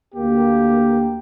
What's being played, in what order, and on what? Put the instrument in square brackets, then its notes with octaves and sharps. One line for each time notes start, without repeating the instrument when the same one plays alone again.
[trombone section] D2 A#3 [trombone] G4